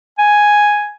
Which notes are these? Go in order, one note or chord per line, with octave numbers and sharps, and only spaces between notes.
G#5